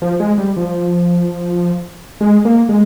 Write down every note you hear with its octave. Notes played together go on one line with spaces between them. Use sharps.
F3
G#3
G3
F3
G#3
A#3
G#3